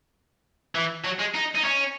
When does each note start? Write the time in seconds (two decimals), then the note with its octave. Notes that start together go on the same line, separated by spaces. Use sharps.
0.75 E3
1.05 F#3
1.19 G#3
1.35 D#4
1.55 D#4
1.64 C#4